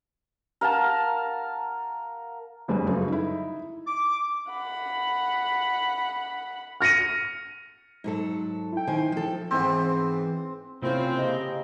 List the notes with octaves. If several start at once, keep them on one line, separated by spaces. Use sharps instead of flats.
A#4 F5 F#5 A5
F#1 F2 G3 G#3 D4 B4
F#2 C#3 A3
D#4 E4
D6
F#5 B5
F6 A#6 C#7 D#7
G#2 F#3 A4
E4 G5
D#3 C5 G#5
F3 A4
G#2 E3 B3 C4
C3 A3 A#3 C4 C#4 E4 F4
C#3 A#3 G4 D#5